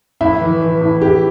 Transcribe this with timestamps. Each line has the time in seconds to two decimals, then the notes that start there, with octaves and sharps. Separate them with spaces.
0.21 A2 E4
0.41 E3
0.62 E3
0.81 A2
1.01 A2 G4